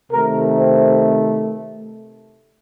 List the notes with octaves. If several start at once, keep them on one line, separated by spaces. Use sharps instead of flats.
C3 D#3 A3 A#4
C4